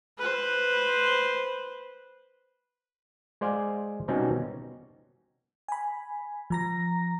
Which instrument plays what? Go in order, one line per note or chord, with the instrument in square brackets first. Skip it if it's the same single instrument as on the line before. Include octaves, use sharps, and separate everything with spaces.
[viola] B4 C5
[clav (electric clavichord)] G#3 C5 D5 F5 G#5
B2 G3 C4 C#4 D#4 F#4
[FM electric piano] G#5 B5
F3 A#5 A#6